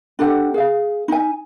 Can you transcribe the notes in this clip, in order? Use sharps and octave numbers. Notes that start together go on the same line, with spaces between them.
D4 G4 A4 F#5
G#4 F5
D#4 G#5